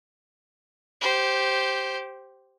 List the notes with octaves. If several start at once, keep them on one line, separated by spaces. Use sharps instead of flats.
G4 C5